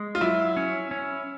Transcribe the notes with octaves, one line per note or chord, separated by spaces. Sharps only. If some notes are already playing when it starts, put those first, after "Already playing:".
Already playing: G#3
F4
F#3 E4
C#4
C#4